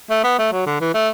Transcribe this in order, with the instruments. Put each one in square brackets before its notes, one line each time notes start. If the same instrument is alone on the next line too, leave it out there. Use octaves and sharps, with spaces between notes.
[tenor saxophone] A3
B3
A3
F#3
D3
E3
A3